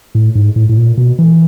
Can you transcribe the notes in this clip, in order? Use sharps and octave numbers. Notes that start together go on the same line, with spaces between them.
A2
G#2
A2
A2
A#2
B2
E3